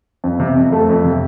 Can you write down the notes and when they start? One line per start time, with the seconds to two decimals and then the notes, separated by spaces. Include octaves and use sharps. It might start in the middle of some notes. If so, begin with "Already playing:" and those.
0.24 F2
0.40 C3
0.57 F2
0.72 A3
0.89 F2
1.05 C3